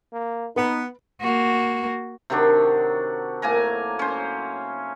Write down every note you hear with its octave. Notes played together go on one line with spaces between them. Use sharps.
A#3
B3 D#4 B4
A#3 F#4
C3 D#3 F#3 D4
A2 A#3 G#5 A#5
C#4 C5